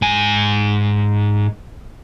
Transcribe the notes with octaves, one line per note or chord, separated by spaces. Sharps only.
G#2 G#5